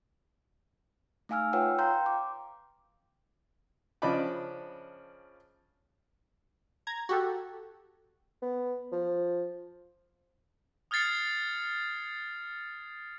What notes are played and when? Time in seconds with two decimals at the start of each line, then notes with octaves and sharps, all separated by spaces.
1.29 A3 D#4 F5 G#5 E6 F6
1.53 F4 B4 C#5 F#5 G5 E6
1.79 F5 G5 A#5 C6 G6
2.06 D6
4.02 C#3 F3 D4 D#5 B5 D6
6.87 A#5 G#6
7.09 F#4 G4 A4
8.42 B3
8.92 F3
10.91 D#6 F6 G#6 A6 C7 C#7